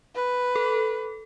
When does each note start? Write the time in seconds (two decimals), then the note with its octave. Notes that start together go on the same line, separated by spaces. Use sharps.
0.15 B4
0.56 A4